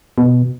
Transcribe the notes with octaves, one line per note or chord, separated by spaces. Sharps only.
B2